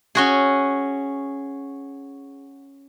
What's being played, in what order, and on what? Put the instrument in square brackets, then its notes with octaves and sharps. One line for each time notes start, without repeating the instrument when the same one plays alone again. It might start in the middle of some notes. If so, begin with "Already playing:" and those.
[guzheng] C#4 F#4 G#4